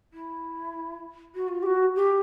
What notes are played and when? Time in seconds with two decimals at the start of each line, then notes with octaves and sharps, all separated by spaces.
0.13 E4
1.35 F#4
1.48 F4
1.63 G4
1.66 F#4
1.96 G4